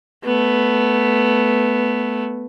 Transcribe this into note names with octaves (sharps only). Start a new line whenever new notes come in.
A3 B3